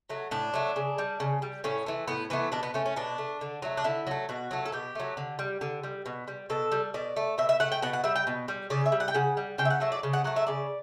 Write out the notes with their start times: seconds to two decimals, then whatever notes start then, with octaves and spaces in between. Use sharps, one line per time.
0.09 F#3 A3
0.31 A2 D4
0.54 F#3 A3
0.76 C#3
0.98 G3
1.20 C#3
1.42 G3
1.64 A2 C#4
1.86 E3 A3
2.08 A2 B3
2.30 E3 A3 B3
2.52 B2 D4
2.63 B3
2.74 A3 C#4
2.86 C#4
2.96 B2 D4
3.18 A3
3.41 D3
3.62 F#3 A3
3.77 D4
3.84 D3 E4
4.07 F#3 A3
4.29 B2 F#4
4.51 F#3 A3
4.66 A4
4.72 B2 G4
4.95 F#3 A3
5.17 D3
5.39 G3
5.61 D3
5.83 G3
6.06 B2
6.28 G3
6.50 B2 A4
6.72 G3
6.94 B2 D5
7.16 A3
7.38 B2 E5
7.49 E5
7.60 A3 F#5
7.72 G5
7.82 B2 F#5
7.93 F#5
8.04 G3 E5
8.16 G5
8.27 B2
8.48 G3
8.70 C#3 D5
8.86 E5
8.92 G3
9.00 F#5
9.08 G5
9.14 C#3 F#5
9.37 G3
9.58 C#3 G5
9.65 E5
9.70 F#5
9.80 F#3 A3 E5
9.92 D5
10.03 C#3
10.13 F#5
10.24 F#3 A3 F#5
10.36 E5
10.47 C#3 D5